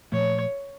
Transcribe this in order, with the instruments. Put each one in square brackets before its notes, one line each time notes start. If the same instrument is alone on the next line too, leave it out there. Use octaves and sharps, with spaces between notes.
[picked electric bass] A#2 F3 A3 [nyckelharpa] C#5